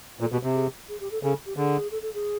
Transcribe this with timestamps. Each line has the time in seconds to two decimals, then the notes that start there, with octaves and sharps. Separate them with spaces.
0.20 A#2 A4
0.32 B2 G4
0.43 C3 G4
0.55 G#4
0.89 G#4
1.00 G4
1.11 A4
1.23 C#3 A4
1.46 G4
1.57 D3 G#4
1.91 A4
2.02 A4
2.14 G#4